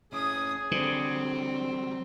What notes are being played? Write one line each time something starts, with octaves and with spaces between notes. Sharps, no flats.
C#4 E4 G#4 D#6
D3 F#3 G3 C4